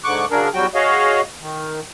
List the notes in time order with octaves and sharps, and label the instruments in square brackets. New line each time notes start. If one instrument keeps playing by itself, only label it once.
[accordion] G#2 D3 C#6 D6 F#6
C#3 F#3 D4 G#4 A#4
E2 F#3 G3 F#4 G5
F#4 G#4 C#5 D#5 F5
D#3